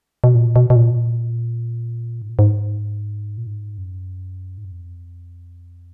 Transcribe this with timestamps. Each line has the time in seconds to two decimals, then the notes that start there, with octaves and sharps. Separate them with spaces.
0.24 B2
0.35 A#2
0.56 B2
0.70 B2
0.76 A#2
0.91 B2
0.96 A#2
2.22 G#2
2.30 A#2
2.39 G#2
3.38 A#2
3.47 G#2
3.78 F#2
4.58 G#2
4.65 F#2
4.72 F2